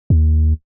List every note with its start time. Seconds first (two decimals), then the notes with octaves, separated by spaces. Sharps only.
0.10 D#2